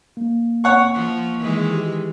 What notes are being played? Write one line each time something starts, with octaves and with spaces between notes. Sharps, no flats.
A#3
C#5 F#5 C#6
F3
D#3 E3 G#3
G4